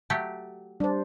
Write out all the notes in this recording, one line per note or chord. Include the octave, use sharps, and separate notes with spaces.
F#3 A3 G4
G3 D4 C5